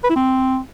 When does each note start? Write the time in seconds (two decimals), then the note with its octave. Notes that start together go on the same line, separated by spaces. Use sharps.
0.04 B4
0.10 E4
0.16 C4